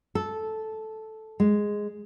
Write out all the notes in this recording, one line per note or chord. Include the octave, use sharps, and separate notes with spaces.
A4
G#3